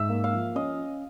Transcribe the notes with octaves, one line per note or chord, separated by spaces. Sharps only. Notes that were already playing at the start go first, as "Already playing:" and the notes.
Already playing: G#2 E5
A#3
F5
F3
C#4 D#5